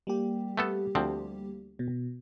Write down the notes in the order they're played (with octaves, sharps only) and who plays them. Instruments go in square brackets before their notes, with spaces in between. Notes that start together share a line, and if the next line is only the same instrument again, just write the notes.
[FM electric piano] G3 A#3 G4
[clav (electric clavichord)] A3 B3 A4
D2 F3 C4
[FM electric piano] B2